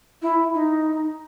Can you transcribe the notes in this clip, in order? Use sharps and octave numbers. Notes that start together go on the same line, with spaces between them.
E4
D#4